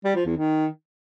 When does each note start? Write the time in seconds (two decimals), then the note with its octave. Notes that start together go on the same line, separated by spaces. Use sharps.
0.05 G3
0.16 F3
0.26 E2
0.37 D#3